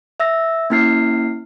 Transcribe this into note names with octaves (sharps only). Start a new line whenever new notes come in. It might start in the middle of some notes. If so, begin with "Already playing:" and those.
E5 E6 A#6
A#3 C#4 E4 F6 C7